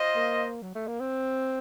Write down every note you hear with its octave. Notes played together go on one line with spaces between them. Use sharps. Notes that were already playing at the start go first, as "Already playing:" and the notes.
Already playing: F4 C5 D#5
A#3
F#3
A3
A#3
C4